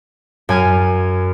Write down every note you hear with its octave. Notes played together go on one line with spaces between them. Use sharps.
F#2 G#5 F6